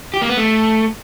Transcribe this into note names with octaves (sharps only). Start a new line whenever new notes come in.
G4
A#3
B3
A3